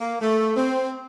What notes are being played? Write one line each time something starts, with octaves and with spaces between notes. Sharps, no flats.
A#3
A3
C4